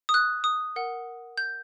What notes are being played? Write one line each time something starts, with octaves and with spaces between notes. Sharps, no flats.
D#6
F#6
D#6
A#4 F#5
G6